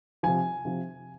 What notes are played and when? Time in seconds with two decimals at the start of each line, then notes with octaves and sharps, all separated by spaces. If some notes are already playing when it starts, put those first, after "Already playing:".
0.23 C3 F3 G#5
0.65 C3 F3